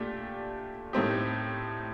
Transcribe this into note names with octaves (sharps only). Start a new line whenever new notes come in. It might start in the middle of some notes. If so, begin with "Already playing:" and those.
Already playing: A#2 A3 D4 G4
A2 A3 C4 D#4 G4